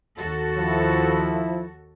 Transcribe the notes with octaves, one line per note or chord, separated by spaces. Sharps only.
D#2 F#4 A4
F3 E4